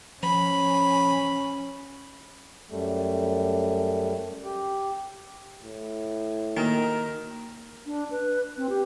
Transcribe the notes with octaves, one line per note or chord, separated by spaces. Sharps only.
F3 C#4 B5
F#2 G3 A3
G4
A2
D#3 A#3 F#4 A#4
D4
B4
C4
G4